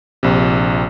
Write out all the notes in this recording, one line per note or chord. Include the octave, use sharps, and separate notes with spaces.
A#1 C3